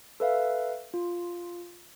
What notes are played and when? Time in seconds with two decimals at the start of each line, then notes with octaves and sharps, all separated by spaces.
0.20 A4 B4 E5 F5
0.94 F4